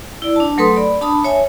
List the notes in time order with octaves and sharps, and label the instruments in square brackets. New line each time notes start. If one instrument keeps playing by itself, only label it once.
[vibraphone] E4 D5
D4 A5
F#3 A3 A4 B4 C6 D#6
D5 B5
D4 A5 B5 D#6
C#5 E5 G#5